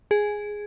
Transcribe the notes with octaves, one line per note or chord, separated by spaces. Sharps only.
G#4